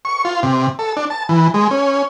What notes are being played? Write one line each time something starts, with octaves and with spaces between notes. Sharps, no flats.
C#6
F4
C3
A4
D4
A5
E3
G#3
C#4